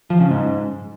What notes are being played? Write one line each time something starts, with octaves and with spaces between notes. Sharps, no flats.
F3
C#3
G#2